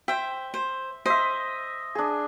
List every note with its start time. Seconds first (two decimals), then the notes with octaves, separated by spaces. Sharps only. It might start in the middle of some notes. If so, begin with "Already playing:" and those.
0.08 C5 E5 G5
0.54 C5
1.06 C5 D#5 E5
1.95 D4 G#4